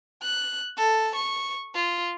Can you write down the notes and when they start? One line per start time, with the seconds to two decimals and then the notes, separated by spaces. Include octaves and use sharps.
0.23 F#6
0.78 A4
1.16 C#6
1.75 F4